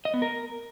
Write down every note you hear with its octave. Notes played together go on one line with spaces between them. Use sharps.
D#5
B3
A#4